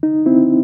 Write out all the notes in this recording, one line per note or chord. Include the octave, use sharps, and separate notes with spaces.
D#4
C4 E4